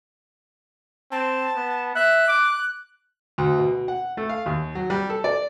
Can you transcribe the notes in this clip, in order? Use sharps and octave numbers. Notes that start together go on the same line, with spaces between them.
C4 A5
B3
E5 F#6
D6
D2
B2
F#5
A3
F5
D#2
F#3
G3
A4
D5